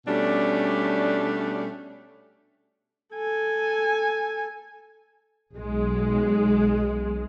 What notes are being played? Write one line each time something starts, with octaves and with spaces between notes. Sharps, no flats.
B2 G3 A3 C#4 D4
A4 G#5
B1 G#3